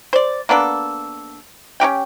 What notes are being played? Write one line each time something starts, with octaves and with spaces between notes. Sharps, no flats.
C5 D5
A#3 B3 D4 A4
C#4 D#4 G4 G5